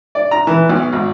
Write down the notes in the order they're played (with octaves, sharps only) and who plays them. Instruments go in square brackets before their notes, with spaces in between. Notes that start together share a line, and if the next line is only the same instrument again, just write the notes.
[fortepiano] D5
A#5
E3
B1
G#1